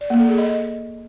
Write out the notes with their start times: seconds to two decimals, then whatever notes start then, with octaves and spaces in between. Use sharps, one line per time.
0.01 D5
0.10 A#3
0.20 A4
0.29 G#4
0.38 D#5